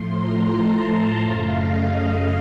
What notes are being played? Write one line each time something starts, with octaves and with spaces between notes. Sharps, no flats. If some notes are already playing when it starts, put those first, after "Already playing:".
Already playing: A2 F3 A3 C6
A#5
A5
F#2 C#3 A3 F5
D#5